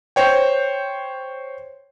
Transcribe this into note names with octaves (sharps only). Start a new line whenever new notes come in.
C5 C#5 G5